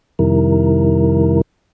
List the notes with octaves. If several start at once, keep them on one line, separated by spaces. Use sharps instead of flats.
F2 C3 D#3 G3 E4 A#4